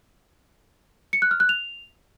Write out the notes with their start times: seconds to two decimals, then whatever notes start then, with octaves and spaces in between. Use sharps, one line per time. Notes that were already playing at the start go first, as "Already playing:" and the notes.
1.13 C#7
1.22 F#6
1.31 F6
1.40 F#6
1.49 F7